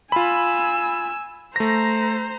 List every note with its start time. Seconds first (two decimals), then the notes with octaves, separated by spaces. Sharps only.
0.12 F4 G#5 B5 E6
1.56 A3 C5 A#5 A#6